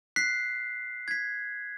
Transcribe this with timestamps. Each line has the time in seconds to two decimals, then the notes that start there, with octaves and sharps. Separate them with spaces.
0.16 F#6 B6 C7
1.08 G#6 B6